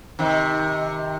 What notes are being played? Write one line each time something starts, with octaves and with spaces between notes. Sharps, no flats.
C3 D#3